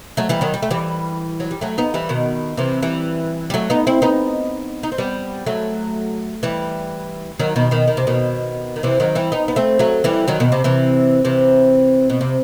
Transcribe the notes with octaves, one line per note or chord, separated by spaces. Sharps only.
F#3 A3
E3 G3
D#3 F#3
G3
A3
E3 G3
F#3
G3
F#3 A3
B3 D#4
E3 G3
B2 D#3
C3 E3
E3 G3
G3
F#3 A3
B3 D#4
C4 E4
B3 D#4
D#4
C4
G3 B3
F#3 A3
E3 G3
D#3 F#3
B2 D#3
B2 D#3
D#3
C3
B2 D#3
D#3
C3 E3
D#3 F#3
E3 G3
B3 D#4
B3
A3 C4
F#3 A3
E3 G3
D#3 F#3
B2 D#3
C3
C3 E3
C3 E3
B2
C3